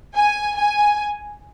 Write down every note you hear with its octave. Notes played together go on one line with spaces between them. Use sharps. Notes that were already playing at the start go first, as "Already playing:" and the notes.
G#5
G#5